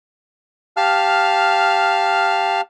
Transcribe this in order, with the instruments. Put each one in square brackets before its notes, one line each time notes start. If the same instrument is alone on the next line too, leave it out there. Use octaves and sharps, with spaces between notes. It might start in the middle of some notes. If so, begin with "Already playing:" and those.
[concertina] G4 F5 A5 F6